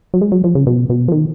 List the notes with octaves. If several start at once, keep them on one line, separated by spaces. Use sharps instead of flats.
F#3
G#3
F#3
F3
C#3
B2
B2
F3
D#3